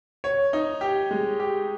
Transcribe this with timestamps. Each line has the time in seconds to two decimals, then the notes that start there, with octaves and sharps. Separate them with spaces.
0.24 C#5
0.53 D#4
0.81 G4
1.11 G#3
1.40 G4